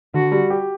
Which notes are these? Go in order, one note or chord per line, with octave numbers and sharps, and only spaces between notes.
D3 F#4
G3
G4